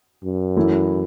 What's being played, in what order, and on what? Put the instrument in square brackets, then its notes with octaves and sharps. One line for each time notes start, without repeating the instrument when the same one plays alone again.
[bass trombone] F#2
[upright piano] E3 A3 E4